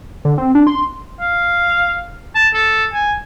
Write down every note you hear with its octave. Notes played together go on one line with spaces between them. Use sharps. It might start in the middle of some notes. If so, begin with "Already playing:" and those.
D3
C4
D4
C6
F5
A5
A4
G#5